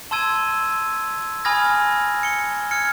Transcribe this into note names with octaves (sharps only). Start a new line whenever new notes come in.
A5 C6 E6 G#6 D#7
E6
G#5 B5 D#6 F6 G#6 A#6
C#7 G7
F6 G#6 C#7